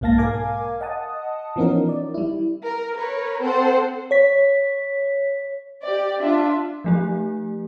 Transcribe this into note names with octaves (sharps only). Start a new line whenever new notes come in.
B1 G#2 A#3 F5 A5 A#6
A#4 F5 G#5 D6 G#6
D#5 F#5 A5 D#6
E3 F3 B3 C#4 D#4 A#4
D5
G3 E4
A#4
A#4 B4 C#5
C4 A4 C5 F#5
C#5 B6
G4 D5
D4 F4 E5
F3 A3 G4